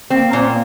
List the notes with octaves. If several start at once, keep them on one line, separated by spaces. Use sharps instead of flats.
A#3 C4
A#2 C#4
C4
A#3